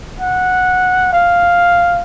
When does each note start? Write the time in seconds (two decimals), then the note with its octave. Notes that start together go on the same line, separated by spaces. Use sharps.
0.20 F#5
1.13 F5